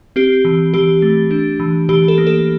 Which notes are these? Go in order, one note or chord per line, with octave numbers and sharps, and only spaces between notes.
C4 G4
E3
E3 G4
A3
D4
E3
E3 G4
A4
A#3
A4